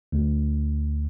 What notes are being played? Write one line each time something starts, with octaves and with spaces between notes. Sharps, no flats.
D2